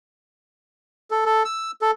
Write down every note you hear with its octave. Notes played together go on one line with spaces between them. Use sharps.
A4
A4
E6
A4